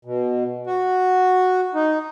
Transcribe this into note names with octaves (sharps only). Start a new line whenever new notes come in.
B2
F#4
D#4